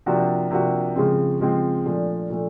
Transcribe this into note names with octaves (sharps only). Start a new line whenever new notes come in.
C3 F3 A#3 D4 F#4
C3 F3 A#3 D4 F#4
C#3 F3 G#3 C4
C#3 F3 G#3 C4
A#2 F3 A3 D4
A#2 F3 A3 D4